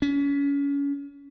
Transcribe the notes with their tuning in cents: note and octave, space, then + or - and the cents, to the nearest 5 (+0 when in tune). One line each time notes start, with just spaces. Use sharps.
C#4 +30